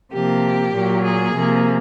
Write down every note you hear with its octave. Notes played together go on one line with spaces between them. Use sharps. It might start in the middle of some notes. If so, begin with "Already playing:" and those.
C3 F3 A#3 G4
A#2 F#3 A#3
G#4
C3 F3 A#3